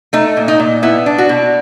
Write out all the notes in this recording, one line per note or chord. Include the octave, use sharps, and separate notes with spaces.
A3 D#4
A#2
D#4
A#2
B3 E4
D4
F#4
B2